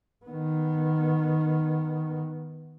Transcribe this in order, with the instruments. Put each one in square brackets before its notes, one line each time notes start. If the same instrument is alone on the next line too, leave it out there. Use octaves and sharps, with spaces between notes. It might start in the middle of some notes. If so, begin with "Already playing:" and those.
[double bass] D#3 B3